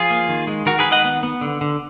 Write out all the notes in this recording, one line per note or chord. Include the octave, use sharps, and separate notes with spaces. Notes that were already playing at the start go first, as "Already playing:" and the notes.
Already playing: F3 F4 G#4
A#3
D#3
G#3
D#3 F#4 A#4
G#4 B4
D#3
D#5 F#5
B3
B3
D3
D3